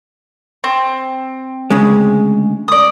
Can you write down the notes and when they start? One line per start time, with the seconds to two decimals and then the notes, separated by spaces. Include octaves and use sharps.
0.64 C4
1.70 D2 C#3 G#3
2.68 D5 D#6